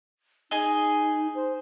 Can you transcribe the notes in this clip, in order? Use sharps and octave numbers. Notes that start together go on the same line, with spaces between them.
D#4 G#4 D#5
C5